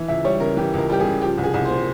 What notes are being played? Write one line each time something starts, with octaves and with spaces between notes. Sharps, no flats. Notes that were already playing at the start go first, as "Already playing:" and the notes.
Already playing: E3
C#2 E5
G3 C#5
C#3 A#4
E3 G4
C#2 A#4
G3 G4
G#4
C#3
F3 G4
C2
G#4
C2
C5
A#2